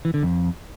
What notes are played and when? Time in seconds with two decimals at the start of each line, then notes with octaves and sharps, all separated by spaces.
0.05 E3
0.14 D3
0.23 F2